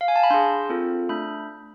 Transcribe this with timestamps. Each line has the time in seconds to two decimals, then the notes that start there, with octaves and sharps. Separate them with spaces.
0.01 F5
0.08 G#5
0.16 A5
0.23 B5
0.30 D4 G#4 C6
0.70 C4 F4 A4
1.09 A3 D4 B5